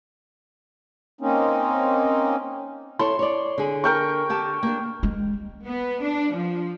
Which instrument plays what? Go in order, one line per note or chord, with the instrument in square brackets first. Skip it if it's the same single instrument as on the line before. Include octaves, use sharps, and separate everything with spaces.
[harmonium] A#3 C4 C#4 D#4
[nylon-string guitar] E4 A4 C#5 [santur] C6
[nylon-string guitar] C#5 D5
D3 G#4
[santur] A#4 G5 C#6
[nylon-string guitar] D3 G4 A5
A#3 D4
[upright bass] G#3
[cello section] B3
D4
F3